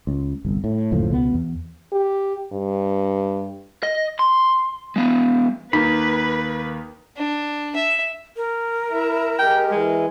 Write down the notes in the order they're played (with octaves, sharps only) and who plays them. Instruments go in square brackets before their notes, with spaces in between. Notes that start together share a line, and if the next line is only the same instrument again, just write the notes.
[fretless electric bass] C#2
G1 C2
A2
F#1 D2 A2 F3
C#2 B2 G#3 B3
E2
[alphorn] G4
G2
[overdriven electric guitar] D#5
C6
G#3 B3
[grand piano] D#2 A#3 [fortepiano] D#3 [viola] B4 [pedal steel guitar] B5
[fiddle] D4
E5
[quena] A#4
[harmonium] E4 E5
[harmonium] G#3 G4 [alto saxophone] G5
[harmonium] E3 [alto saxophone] G#3